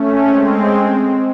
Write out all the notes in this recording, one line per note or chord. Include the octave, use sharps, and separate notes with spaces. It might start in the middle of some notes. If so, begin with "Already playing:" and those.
Already playing: A3 C#4
G#3 C4